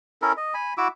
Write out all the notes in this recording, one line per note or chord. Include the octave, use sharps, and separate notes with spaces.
C#4 E4 A4 A#4
D#5
G#5 B5
E4 F#4 D6 E6